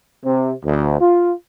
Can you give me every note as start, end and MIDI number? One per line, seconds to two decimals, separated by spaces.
0.24 0.52 48
0.64 0.96 38
1.00 1.32 65